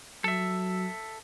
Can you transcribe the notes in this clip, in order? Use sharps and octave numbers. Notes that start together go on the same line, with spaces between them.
F#3 A4 E5